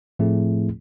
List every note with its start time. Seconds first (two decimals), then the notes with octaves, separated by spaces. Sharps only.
0.19 A2 F3 A3 C4 E4 G#4